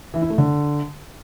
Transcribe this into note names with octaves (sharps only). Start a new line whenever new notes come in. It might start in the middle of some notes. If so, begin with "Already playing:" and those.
E3
E4
A3
D3